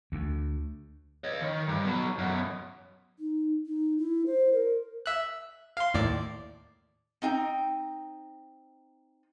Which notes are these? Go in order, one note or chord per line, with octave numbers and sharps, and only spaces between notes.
D2
C#5 D#5
D#3
G2
B2 F#3
F#2 B2
D#4
D#4
E4
C5
A#4
E5 F#6
F5 C6
D#2 A2 D5
C4 D#4 G5